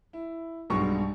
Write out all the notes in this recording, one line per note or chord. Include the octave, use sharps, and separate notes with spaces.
E4
B1 G2 B2 G#3 C#6